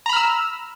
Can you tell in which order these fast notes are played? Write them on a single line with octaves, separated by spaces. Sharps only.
A#5 B5 F6 E6